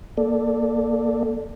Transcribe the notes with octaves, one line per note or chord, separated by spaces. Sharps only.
A#3 A4 D5